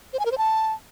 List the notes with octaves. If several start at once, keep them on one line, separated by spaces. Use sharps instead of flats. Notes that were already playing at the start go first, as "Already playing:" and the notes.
C5
G#5
A#4
C5
A5